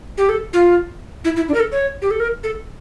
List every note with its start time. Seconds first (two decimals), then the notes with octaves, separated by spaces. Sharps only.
0.18 G4
0.29 A4
0.53 F4
1.25 E4
1.36 E4
1.48 D4
1.54 A#4
1.60 A4
1.72 C#5
2.02 G4
2.11 A4
2.20 A#4
2.44 A4